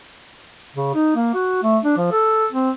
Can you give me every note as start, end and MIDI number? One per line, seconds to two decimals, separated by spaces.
0.75 0.89 49
0.95 1.15 63
1.16 1.30 58
1.34 1.58 66
1.63 1.78 57
1.84 1.95 62
1.97 2.11 53
2.12 2.46 69
2.52 2.71 60